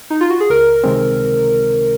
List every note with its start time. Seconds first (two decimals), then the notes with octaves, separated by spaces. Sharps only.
0.10 D#4
0.21 F4
0.30 F#4
0.40 G#4
0.50 C#2 A#4
0.84 C3 D#3 G#3 C4